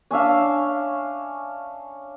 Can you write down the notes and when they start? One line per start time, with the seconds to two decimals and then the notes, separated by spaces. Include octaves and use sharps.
0.11 C#4 D4 E5 F5